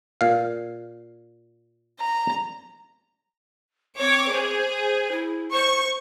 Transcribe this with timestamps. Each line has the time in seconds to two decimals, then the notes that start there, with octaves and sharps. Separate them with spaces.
0.21 A#2 F5
1.99 A#5
3.99 C4 C#5 D6
4.32 G#4 C5
5.12 E4
5.52 C5 C#6